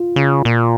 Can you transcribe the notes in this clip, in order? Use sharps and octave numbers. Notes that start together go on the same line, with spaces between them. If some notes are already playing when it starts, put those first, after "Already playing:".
Already playing: F4
C#3
A#2